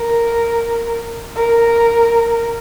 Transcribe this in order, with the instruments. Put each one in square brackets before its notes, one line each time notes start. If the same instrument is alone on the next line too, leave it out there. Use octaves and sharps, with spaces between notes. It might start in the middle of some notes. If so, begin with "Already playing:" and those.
Already playing: [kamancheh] A#4
A#4